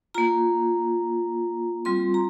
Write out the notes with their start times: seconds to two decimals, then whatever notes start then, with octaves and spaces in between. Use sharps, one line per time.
0.14 A#3 F4 A#5
1.85 G3 C4 F4 C6
2.14 A#5